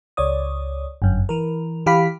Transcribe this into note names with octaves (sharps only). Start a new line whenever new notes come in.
C#2 C#5 D5 D#6
G1 F#2
E3 A#4
E3 G4 F5 B5 B6